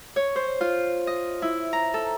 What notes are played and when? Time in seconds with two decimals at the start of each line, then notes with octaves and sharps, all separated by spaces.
0.16 C#5
0.36 C5
0.61 F4
1.07 D#5
1.42 E4
1.73 A#5
1.94 A4